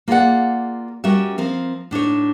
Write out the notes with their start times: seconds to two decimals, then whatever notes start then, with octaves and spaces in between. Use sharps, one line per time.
0.08 A#3 F4 G#4 C#5 D5 F#5
1.04 G3 C#4 F#4 A#4 E5
1.38 F3 C4 A#4
1.91 A2 D4 D#4 C#5